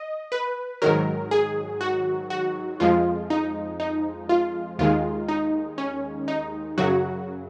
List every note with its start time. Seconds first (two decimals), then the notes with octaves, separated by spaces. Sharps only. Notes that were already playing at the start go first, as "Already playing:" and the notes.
Already playing: D#5
0.32 B4
0.82 G#2 D#3 F#3 A#4
1.31 G#4
1.81 F#4
2.30 F#4
2.80 F2 F3 G#3 F4
3.30 D#4
3.80 D#4
4.29 F4
4.79 D#2 D#3 G#3 F4
5.28 D#4
5.78 C#4
6.28 D#4
6.78 F#2 C#3 F#3 F#4